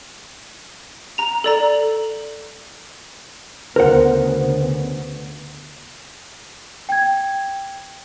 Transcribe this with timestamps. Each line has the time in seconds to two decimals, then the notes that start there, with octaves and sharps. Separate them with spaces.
1.18 A#5 F7
1.44 A4 D5 A#5
3.76 D2 C#3 B3 A#4 C5 F#5
6.89 G5 G#6